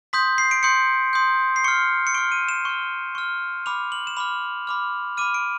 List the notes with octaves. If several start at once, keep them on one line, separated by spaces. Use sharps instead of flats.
C6 D#6 G6 B6
C7
D7
C6 D#6 G6 C#7
C6 D#6 G6
C7
C#6 F6 C#7
C#7
C#6 F6 D7
D#7
E7
C#6 F6
C#6 F6
B5 D6 F6 F7
F#7
E7
B5 D6 F6 F7
B5 D6 F6
B5 D6 F6 D#7
D7